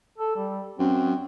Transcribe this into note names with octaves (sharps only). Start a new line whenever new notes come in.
A4
G3
F#2 C4